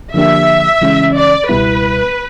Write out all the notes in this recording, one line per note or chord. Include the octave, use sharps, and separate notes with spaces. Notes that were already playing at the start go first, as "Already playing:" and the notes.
D3 F3 A#3 D4 G4 E5
C#3 E3 G#3 C#4
D5
C#2 B2 G3 B3 E4 B4